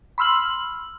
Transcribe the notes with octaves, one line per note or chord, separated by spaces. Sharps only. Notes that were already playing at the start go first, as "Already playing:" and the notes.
B5 C6 E6 F6 F#7